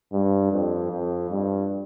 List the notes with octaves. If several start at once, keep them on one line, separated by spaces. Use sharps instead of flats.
G2
F2
F2
G2